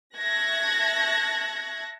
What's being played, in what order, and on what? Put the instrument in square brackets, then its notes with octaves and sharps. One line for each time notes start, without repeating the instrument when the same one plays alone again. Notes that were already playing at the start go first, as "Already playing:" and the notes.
[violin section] E5 A5 C#6 F#6 G#6 A#6